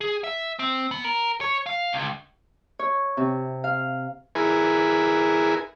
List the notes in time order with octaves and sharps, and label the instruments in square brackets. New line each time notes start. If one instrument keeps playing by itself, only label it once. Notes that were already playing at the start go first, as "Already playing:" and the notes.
[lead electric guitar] G#4
E5
C4
B3
A#4
C#5
F5
C#2
[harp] C#5
C3
F5
[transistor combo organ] E4 G#4 A#4 B4 G#5